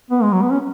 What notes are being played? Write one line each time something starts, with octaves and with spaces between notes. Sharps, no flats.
B3
G#3
F#3
B3
C#4